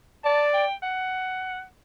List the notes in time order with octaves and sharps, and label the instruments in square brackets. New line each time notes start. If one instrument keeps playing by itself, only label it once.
[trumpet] D5 [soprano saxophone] A5
[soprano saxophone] G5
F#5